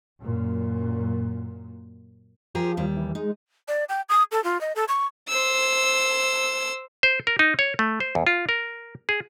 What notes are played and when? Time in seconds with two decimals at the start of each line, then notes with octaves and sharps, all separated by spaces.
0.21 F#2 A#2
2.55 F3 G4 G#4 A#4
2.77 D#2 G3
2.97 E3
3.15 G#3 D#4
3.68 D5
3.89 G5
4.09 D#6
4.32 A4
4.44 F4
4.61 D#5
4.76 A4
4.88 C#6
5.29 C5 E6
7.03 C5
7.27 A#4
7.39 D#4
7.59 C#5
7.79 A3
8.00 C5
8.15 E2
8.27 F4
8.49 A#4
9.09 G#4